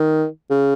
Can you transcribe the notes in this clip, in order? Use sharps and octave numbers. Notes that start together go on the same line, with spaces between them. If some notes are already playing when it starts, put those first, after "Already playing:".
Already playing: D#3
C#3